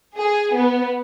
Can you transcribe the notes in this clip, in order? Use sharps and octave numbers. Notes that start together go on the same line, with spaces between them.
G#4
B3